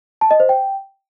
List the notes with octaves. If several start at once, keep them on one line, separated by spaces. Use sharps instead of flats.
A5
D#5
C5
G5